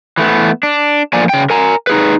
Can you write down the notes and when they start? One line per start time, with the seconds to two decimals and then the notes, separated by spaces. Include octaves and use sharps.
0.17 E3 A3 B3
0.63 D4
1.13 D3 F3 A#3 D5 G#5
1.29 C#3 G5
1.50 A#4 G#5 A#5
1.87 D#4 G#4 B4